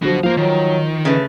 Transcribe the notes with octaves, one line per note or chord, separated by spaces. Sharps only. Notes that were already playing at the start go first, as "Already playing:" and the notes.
D3 F3 F#3 B3 F#4
F3 A#3 C5 F5
D#3 F#3
C#3 A3 B4